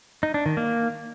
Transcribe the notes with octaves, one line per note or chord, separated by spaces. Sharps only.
D#4
D4
D#3
A#3